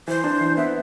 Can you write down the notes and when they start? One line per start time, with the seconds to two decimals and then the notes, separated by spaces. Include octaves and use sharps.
0.08 E3 C5
0.24 D4
0.41 E3
0.57 B3 E5